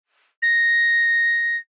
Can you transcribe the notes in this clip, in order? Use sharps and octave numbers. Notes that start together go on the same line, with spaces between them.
A#6